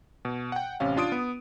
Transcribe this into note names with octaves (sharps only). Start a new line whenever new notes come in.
B2
F#5 G5
A1 C3 C#4 F5
D4 F4 D#6 D7
B3